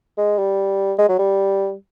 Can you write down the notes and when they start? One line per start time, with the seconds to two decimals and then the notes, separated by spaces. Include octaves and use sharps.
0.18 G#3
0.38 G3
0.98 G#3
1.09 F#3
1.19 G3